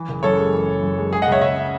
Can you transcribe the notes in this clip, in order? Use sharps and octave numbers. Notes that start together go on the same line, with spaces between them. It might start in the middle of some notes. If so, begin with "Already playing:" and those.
Already playing: E3
F#1
F#2 A4 C#5
G#3
E3
F#1
F#2
G#3
G#3 G#4
D#5 F#5
C#2 C#5 E5
C#3 C#5 E5
C#4